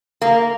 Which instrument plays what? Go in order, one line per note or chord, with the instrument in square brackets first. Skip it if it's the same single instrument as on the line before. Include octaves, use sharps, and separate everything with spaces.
[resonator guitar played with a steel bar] A#3